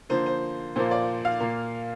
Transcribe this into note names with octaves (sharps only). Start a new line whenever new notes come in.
D3 F3 A#3 C5
C5
A#2 F3 A#3 C5
D5
F5
A#2 A#3